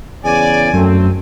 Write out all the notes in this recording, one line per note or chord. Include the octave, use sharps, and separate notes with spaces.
E2 C#3 D5 G#5
F#2 F#3 A3 C4